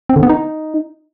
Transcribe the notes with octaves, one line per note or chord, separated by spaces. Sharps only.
C4
D3
B3
D#4